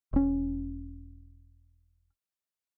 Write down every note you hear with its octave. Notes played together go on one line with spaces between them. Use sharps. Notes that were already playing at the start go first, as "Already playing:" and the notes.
E1 C#4